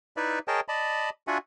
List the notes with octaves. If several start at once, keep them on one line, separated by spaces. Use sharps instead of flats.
D#4 E4 B4 D5 E5
G#4 A#4 C#5 D#5 G5 A5
D5 D#5 A5 B5
D4 F4 F#4 E5 F#5 G#5